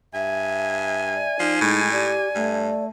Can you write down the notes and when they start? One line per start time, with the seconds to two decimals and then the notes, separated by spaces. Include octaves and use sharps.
0.14 G2 E5 G#5
1.15 D5
1.40 F3 D#4
1.61 A2 G#3
1.92 G4 D5
2.35 G2 A3